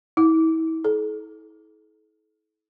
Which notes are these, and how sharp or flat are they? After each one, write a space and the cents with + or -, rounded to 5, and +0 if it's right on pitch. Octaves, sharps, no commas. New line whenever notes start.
E4 -35
A4 -40